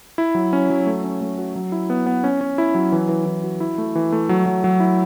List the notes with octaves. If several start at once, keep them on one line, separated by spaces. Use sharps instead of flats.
E4
F#3
C#4
F#3
A3
C#4
A3
F#4
F#3
E4
B3
B3
C#4
C#4
E4
F#3
E3
E3
E3
F#4
E4
A3
E3
A3
F#3
F#3
F#3
E4